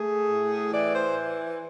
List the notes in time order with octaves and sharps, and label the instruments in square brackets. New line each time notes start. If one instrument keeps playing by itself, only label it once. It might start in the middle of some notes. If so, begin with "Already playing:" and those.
Already playing: [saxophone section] A3 G#4
A2
E3 D5
C5